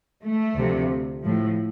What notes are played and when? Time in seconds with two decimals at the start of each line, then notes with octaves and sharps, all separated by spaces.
0.23 A3
0.56 D2 C3 F3
1.22 A2 F3